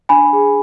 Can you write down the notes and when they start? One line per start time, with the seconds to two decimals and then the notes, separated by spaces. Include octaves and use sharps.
0.09 D4 G#5 B5
0.33 G#4